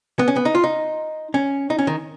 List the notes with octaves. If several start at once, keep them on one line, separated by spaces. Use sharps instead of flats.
B3
C#4
B3
D#4
F4
D#4
C#4
D#4
C#4
D#3